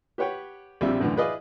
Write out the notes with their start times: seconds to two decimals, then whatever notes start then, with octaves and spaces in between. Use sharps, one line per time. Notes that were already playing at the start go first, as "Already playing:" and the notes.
0.18 G4 B4 C#5 F#5 G5
0.81 A#1 C3 G3 C4 F4 E5
1.00 F#2 A2 D3 E3
1.16 E4 G#4 B4 D5 D#5 F5